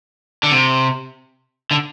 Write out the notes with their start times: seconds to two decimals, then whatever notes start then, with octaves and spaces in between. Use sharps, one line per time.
0.43 D3
0.51 C3
1.71 D3